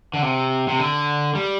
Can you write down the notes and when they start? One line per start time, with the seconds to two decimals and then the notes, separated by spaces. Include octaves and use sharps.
0.14 D3
0.22 C3
0.68 C3
0.79 D3
1.35 G3